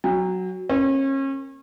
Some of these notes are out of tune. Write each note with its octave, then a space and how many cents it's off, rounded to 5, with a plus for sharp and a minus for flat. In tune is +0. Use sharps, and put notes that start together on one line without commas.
F#3 +0 G5 +40
A#3 +0 C#4 -35